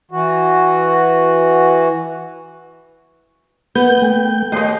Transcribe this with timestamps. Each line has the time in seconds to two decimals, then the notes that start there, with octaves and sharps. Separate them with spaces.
0.11 E3 F#4
3.75 A#3 B3 G6
4.02 A3 G5
4.52 D#2 A#3 D#5 G5 C6